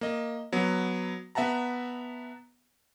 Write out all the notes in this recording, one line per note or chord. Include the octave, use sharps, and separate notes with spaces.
A#3 D#5
F#3 B3
B3 E5 F#5 A5 A#5